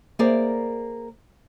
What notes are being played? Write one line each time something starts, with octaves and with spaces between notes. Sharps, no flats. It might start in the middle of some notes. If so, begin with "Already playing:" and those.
A#3 G#4 A#4 C5 D5